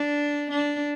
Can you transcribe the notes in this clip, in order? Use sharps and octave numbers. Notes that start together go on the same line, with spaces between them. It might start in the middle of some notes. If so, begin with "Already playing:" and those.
Already playing: D4
D4